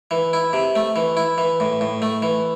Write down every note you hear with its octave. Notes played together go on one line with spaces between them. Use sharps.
E3
E4
C3
A3
E3
E4
E3
A2
A2
A3
E3